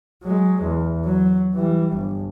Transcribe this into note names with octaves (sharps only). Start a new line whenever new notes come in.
F#3 G#3
E2
F#3
E3 G3
G1